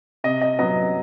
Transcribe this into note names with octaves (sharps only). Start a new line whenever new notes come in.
C3 D#5
D#5
F#3 B3 D#5